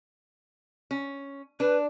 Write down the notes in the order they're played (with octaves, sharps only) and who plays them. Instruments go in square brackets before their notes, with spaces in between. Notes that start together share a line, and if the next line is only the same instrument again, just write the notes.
[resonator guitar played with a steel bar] C#4
[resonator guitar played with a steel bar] D4 [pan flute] B4